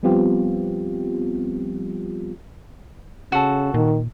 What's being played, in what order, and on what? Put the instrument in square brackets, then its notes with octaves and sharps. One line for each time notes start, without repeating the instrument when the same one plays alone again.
[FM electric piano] F3 G3 B3 C4 F4 G4
[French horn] C#3 [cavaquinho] F#4 A4
[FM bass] A#2 [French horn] D#3